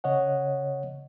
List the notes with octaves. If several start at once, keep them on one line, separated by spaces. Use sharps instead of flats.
C#3 C#5 D#5 F#5